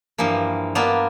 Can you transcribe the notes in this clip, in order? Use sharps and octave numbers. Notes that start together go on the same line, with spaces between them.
G2 E3 F3 A#3
A#3 B3 D4 F4 D5